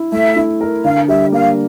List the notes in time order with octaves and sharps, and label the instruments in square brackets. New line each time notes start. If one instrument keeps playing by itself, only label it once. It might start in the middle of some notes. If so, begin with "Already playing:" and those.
Already playing: [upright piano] E4
[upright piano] A3 [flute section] E5
[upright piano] E4
A#4
[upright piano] D3 [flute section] F5
[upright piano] G3 [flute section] E5
[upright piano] A#3 [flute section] F5